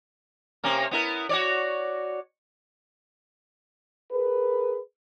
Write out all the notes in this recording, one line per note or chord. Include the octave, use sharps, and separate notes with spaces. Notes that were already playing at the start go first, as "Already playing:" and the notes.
C3 A#3 C#4
B3 E4 A#4
F#4 C#5 D5
G#4 A#4 B4